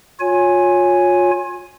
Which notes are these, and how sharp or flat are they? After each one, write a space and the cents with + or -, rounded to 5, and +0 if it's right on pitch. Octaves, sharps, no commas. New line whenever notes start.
F4 +35 C#5 +0 G#5 +0